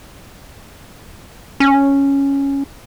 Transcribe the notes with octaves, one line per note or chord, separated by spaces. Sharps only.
C#4